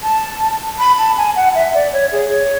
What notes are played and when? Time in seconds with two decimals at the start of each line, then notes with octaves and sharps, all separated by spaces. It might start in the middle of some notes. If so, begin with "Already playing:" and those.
0.03 A5
0.79 B5
0.98 A5
1.17 G#5
1.36 F#5
1.55 E5
1.74 D5
1.92 C#5
2.12 G#4
2.30 C#5